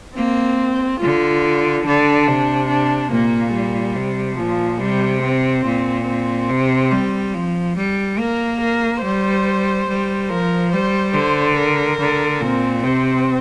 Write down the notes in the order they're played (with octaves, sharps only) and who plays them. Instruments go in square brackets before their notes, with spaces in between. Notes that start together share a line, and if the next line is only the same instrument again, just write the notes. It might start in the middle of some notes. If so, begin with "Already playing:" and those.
[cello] A#3 [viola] C4
[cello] D3 [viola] F4
[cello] D3 [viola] D4
[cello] C3
[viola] D4
[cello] A#2 [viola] A#3
[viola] G3
[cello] C3
[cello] A#2 [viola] F3
[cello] C3 [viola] G3
[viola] C4
[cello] A#2
[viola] C4
[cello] C3
G3
F3
G3
[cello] A#3 [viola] A#4
[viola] A#4
[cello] G3 [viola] C5
[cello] G3
[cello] F3 [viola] A#4
[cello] G3 [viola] C5
[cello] D3 [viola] C5
[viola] A#4
[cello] D3
[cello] A#2 [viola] C4
[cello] C3 [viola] C4